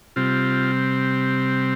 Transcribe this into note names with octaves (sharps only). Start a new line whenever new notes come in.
C3 G3 C4 F4